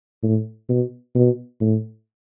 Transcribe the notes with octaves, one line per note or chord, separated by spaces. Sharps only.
A2
B2
B2
A2